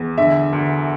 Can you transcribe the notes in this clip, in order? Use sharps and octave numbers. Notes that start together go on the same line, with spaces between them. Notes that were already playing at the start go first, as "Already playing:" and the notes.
Already playing: E2
D3 E5
D2